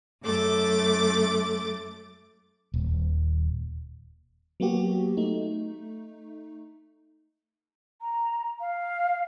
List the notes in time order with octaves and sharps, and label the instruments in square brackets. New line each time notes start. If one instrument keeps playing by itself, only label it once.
[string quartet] F#2 A3 D6 A6
[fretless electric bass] D#1
[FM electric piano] F#3 A#3 B3 F#4 G4
A3 D#4
[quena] A#5
F5